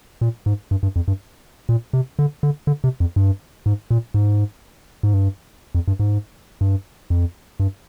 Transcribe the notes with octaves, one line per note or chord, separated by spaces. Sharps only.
A#2
G#2
G2
G2
F2
G2
A#2
C3
D3
D3
D3
C3
F2
G2
G#2
A#2
G#2
G#2
G2
F2
G2
G#2
G2
F2
G2